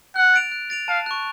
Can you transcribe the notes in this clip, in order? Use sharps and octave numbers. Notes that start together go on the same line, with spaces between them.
F#5 F#6
A6 D7 F7
F#6
A6 D7 F7
F5 A5
C#6 F#6